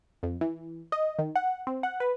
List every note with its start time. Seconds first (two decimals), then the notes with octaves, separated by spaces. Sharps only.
0.23 F2
0.41 E3
0.92 D#5
1.19 D#3
1.36 F#5
1.67 C4
1.83 F#5
2.00 B4